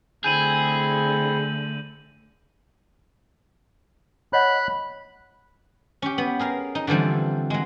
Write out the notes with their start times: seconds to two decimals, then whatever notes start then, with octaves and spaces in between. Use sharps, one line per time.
0.24 D3 A3 C4 E4 G#4 G6 D#7 F#7
4.33 C#5 D#5 F#5 B5 F#6
6.02 C#4 G4
6.18 B3
6.39 G#4 A#4 F5
6.75 D#4
6.87 D3 E3 F3 G3 C4
7.50 F#3 G#3